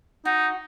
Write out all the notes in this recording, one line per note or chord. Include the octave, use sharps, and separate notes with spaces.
D#4 F#4